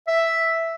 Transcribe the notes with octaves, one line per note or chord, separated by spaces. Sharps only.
E5